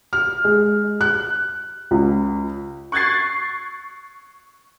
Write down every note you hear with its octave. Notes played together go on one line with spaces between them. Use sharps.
F6
G#3
F#6
C#2
C#6 F#6 G#6 A6 C7